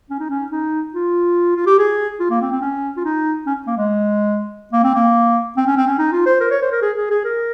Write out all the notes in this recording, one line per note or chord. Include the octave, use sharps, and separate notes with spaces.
C#4
D#4
C#4
D#4
F4
F4
G4
G#4
F4
A#3
C4
C4
C#4
F4
D#4
C#4
A#3
G#3
A#3
C4
A#3
C4
C#4
C4
C#4
D#4
F4
C5
A#4
C#5
C5
A#4
G#4
G#4
G#4
A#4